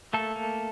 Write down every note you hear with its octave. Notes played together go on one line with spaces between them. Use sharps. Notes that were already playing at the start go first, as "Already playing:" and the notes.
A3 A#3 A4
A#3